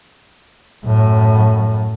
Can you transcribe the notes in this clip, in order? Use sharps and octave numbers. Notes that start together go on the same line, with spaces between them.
F#2 A2